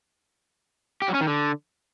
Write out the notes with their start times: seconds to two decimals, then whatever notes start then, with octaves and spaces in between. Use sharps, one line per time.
1.02 G4
1.08 F#3
1.14 C#4
1.21 D#3
1.27 D3